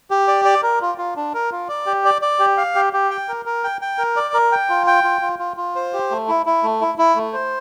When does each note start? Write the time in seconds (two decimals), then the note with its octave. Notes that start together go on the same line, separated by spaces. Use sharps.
0.11 G4
0.28 D5
0.45 D5
0.63 A#4
0.81 F4
0.98 F4
1.17 D4
1.34 A#4
1.52 F4
1.69 D5
1.86 G4
2.05 D5
2.22 D5
2.39 G4
2.57 F5
2.75 G4
2.93 G4
3.11 G5
3.29 A#4
3.45 A#4
3.64 G5
3.81 G5
3.98 A#4
4.16 D5
4.34 A#4
4.52 G5
4.69 F4
4.87 G5
5.04 F4
5.22 F4
5.39 F4
5.57 F4
5.76 C5
5.93 G4
6.11 A3
6.28 E4
6.46 E4
6.63 A3
6.81 E4
6.98 E4
7.16 A3
7.33 C5